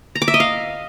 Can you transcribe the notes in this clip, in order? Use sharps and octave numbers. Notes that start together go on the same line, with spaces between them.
A#5
D6
E5
D#5
F5